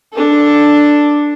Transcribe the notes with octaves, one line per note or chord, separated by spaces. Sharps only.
D4 A4